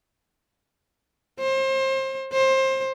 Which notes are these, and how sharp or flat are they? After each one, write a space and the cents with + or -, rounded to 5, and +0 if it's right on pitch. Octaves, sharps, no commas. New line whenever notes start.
C5 +30
C5 +25